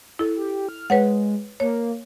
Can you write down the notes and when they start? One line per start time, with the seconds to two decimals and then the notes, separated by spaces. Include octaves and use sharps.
0.19 E4 A4
0.35 G4
0.69 F6
0.90 G#3 B4 C#5 F#5
1.60 A#3 C#5